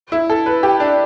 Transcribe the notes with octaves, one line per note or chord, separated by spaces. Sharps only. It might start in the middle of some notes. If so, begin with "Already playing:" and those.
E4
A4
B4
G4
D4